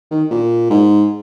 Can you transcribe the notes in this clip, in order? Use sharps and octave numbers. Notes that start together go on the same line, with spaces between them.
D#3
A#2
G#2